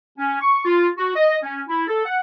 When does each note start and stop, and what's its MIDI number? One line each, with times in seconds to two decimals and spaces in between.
0.17 0.38 61
0.41 0.62 85
0.65 0.89 65
0.98 1.14 66
1.15 1.37 75
1.43 1.61 61
1.68 1.87 64
1.88 2.04 69
2.05 2.20 78